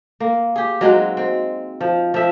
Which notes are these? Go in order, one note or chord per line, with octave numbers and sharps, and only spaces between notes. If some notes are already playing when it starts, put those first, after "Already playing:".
A#3
G4 G#4
F#3 G#3 C4 D#4
C4
F3
F3 E5